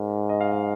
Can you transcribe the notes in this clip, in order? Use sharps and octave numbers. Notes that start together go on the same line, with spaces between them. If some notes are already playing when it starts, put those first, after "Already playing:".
Already playing: G#2 A#4
D#5
F5
D#5